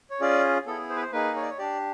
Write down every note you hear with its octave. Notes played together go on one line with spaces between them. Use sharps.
C#5
C#4 F4 G#4 D5
B3 E4 G#4 A4
C5
B4
C5
A#3 D#4 G#4 B4
C#5
D5
C#5
D4 G4 D5